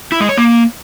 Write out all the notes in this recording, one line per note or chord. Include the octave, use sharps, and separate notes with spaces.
E4
G#3
C#5
A#3